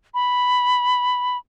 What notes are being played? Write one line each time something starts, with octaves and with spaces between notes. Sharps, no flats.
B5